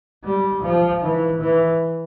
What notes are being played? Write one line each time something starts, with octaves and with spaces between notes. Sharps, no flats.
G3
F3
E3
E3